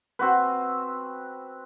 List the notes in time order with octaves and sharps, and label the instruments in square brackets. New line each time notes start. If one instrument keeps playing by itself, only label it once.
[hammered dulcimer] C4 F#4 B4